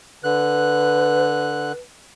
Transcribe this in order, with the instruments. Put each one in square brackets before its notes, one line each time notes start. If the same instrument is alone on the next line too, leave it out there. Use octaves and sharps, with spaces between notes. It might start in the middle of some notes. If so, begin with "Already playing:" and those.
[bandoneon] D3 F#6 [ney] B4